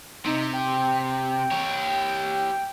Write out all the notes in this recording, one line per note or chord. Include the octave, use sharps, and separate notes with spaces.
C3 D#4
G5
G4 C#5